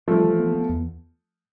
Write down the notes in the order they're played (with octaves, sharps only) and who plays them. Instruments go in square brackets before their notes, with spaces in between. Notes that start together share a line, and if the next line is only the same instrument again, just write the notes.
[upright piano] F3 A3 [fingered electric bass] G3
[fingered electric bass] E3
B3
B3
E2